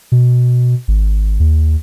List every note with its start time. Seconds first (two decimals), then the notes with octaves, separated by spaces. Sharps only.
0.12 B2
0.88 G#1
1.40 D#2